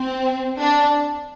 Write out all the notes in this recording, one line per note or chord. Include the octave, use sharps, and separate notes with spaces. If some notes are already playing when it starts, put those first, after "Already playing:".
Already playing: C4
D4